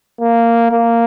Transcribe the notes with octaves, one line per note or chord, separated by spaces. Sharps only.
A#3
A#3